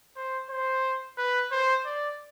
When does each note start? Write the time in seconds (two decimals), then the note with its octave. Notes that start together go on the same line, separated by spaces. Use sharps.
0.16 C5
0.50 C5
1.17 B4
1.51 C5
1.85 D5